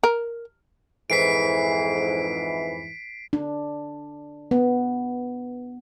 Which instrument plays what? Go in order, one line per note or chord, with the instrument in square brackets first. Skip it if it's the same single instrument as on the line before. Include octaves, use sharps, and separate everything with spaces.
[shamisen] A#4
[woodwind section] F2 G#2 E3 [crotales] B6 C7 D7
[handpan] D4
B3